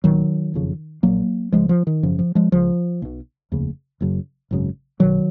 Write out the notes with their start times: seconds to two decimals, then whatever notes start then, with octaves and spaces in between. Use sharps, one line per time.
0.04 B1 A#2 D#3 F#3
0.54 F#1 F2 C#3
1.03 A#1 A#2 F#3 A#3
1.52 C#2 C#3 F3 G#3
1.69 F3
1.87 D#3
2.03 G#1 F#2 C#3 F3
2.19 F3
2.35 F3 G#3
2.52 C#2 C#3 F3
3.02 B1 B2
3.52 F1 D#2 C#3
4.01 F#1 F#2 C#3
4.51 G#1 F#2 C#3
5.00 B1 B2 D#3 F#3